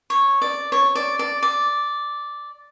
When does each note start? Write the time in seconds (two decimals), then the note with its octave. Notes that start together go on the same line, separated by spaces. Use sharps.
0.10 C#5
0.42 D5
0.72 C#5
0.95 D5
1.19 D5
1.42 D5